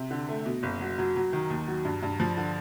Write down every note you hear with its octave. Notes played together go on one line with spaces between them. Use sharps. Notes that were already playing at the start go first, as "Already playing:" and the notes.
Already playing: C3
D3
A3
B2
F#1
F#3
F#3
F#3
D#3
D#2
F#3
G2
G2
F3
D3